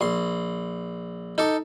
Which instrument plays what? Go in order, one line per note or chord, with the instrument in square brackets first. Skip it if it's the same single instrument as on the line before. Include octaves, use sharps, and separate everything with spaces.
[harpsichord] A#1 C6
D#4 A4 D6